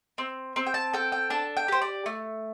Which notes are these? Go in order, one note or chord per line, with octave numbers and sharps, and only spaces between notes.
C4
C4
G5
A5
A4 G5
G5
D4 A5
G5
G4 C5
D5
A3